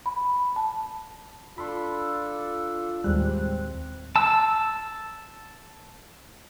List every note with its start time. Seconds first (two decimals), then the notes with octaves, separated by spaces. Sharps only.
0.06 B5
0.56 A5
1.58 D4 F4 A4 B5 C6
3.04 D#2 A2 G3 G#3 C4 F#6
4.16 A5 E6